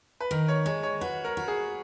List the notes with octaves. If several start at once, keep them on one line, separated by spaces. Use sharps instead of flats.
B4
D#3 A#4
C#5
G#3 C#5
C#5
F#4 B4
A#4
F#4
G#4